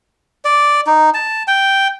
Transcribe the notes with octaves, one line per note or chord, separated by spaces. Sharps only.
D5
D#4
A5
G5